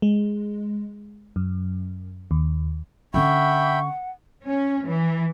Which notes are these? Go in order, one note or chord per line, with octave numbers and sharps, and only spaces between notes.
G#3
F#2
D#2
D3 C#4 E5 F#5 G5 B5 C#6
C#4
E3